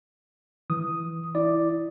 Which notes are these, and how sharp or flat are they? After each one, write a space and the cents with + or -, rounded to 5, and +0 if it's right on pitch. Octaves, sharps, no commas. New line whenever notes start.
E3 +0 D#6 +0
E4 +0 D5 +0